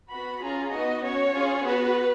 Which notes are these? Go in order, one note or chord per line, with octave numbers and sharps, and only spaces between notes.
B3 F#4 B5
C#4 F4 G#4 A#5
B3 D#4 F#4 D#5
C#4 F#4 C#5
C#4 F4 G#4
B3 F#4 B4